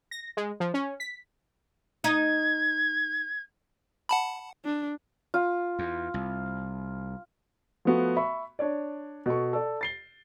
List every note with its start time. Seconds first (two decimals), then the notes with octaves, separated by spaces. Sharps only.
0.11 A#6
0.37 G#3
0.60 F3
0.74 C#4
1.00 B6
2.04 D#4 G#6
4.09 F#5 A5 B5
4.65 D4
5.34 F4
5.79 E2
6.14 C2
7.85 F3 A3 B3 F#4
8.17 E5 B5 C#6
8.59 D4 C#5 D5
9.26 B2 A4 C#6
9.53 A4 D5
9.81 A6 C7 G7